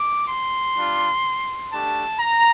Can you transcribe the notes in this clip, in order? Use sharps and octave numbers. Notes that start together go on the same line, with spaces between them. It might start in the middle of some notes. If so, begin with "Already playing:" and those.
Already playing: D6
C6
G3 D4 F4
A3 D4 G4 A5
A#5